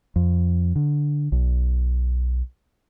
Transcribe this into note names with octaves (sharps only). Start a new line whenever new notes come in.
F2
D3
B1